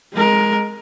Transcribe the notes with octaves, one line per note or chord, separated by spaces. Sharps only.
G#3 A#4